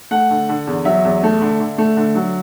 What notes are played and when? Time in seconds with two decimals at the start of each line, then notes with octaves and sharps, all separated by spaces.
0.11 A3 F#5
0.30 D3
0.49 D3
0.67 E2
0.85 F#3 E5
1.05 E2
1.23 A3
1.41 D3
1.60 D3
1.78 A3
1.97 D3
2.15 F#3